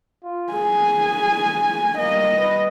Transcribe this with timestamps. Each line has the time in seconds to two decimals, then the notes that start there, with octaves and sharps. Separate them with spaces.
0.24 F4
0.53 G#4 G#5
1.98 G3 A#3 D#5
2.37 B4